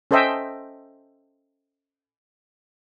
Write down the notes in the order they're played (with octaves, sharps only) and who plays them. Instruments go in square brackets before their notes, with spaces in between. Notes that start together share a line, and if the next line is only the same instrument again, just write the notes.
[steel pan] C#4 A4 C5 D#5 E5 G5